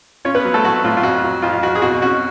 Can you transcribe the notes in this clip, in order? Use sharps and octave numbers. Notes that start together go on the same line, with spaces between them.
C#4 F4 C#5
B3 B4
F#3
A3 A4
F#3 F#4
A2 F4
F4
F2 F#4
F#3
F2 F4
F4
F2 F#4
G#4
B2 F#4
C#4 F#4